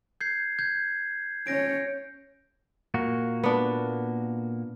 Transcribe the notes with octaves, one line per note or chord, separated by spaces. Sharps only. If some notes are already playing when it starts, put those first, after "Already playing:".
G6 G#6 C7
G6 G#6
C#4 C#5 G6 A#6 D7
A#2 A#3 F#4
B3 D4